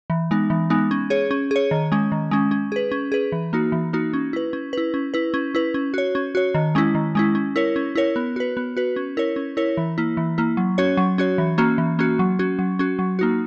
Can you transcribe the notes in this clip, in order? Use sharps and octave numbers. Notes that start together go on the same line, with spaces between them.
E3
G#3 B3 D#4
E3
G#3 B3 D#4
C#4
G#4 C#5
C#4
G#4 C#5
D#3
G#3 C#4
D#3
G#3 C#4
C#4
G#4 B4
C#4
G#4 B4
E3
A#3 D#4 F#4
E3
A#3 D#4 F#4
C#4
E4 B4
C#4
E4 B4
C#4
E4 B4
C#4
E4 B4
C#4
F#4 C#5
C#4
F#4 C#5
D#3
G#3 C#4 E4
D#3
G#3 C#4 E4
C#4
E4 A#4 C#5
C#4
E4 A#4 C#5
B3
F#4 B4
B3
F#4 B4
C#4
E4 A#4 C#5
C#4
E4 A#4 C#5
E3
A#3 E4
E3
A#3 E4
F#3
C#4 F#4 C#5
F#3
C#4 F#4 C#5
E3
A#3 C#4 F#4
E3
A#3 C#4 F#4
F#3
C#4 F#4
F#3
C#4 F#4
F#3
A#3 D#4 F#4